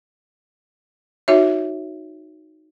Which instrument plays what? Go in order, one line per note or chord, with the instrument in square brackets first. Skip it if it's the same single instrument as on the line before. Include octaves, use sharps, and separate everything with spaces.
[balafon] D#4 F#4 C#5 E5